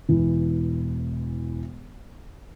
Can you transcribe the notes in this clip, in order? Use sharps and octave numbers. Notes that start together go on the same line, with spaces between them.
E1 E3